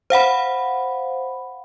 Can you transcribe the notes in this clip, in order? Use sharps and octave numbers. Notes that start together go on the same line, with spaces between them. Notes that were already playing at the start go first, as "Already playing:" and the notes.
C5 F5 F#5 B5